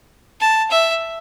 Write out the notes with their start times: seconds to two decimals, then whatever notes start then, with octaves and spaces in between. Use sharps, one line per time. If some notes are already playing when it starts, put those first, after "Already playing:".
0.40 A5
0.70 E5